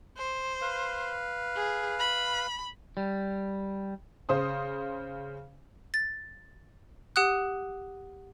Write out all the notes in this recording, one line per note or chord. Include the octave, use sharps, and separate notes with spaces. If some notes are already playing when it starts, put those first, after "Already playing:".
C5
B4 F5
G#4
B5
G3
C#3 C5 C6 D#6
A6
G4 F#5 D#6 F#6